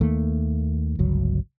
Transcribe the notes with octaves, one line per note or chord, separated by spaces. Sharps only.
D#2 D#3 A3 A#3
G1 C#2 F#3